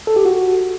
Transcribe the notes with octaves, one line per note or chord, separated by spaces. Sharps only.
A4
G4
F#4